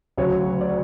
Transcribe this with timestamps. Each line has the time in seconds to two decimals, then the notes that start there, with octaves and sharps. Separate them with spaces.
0.18 D2 C#3 F#3 C#5
0.61 D5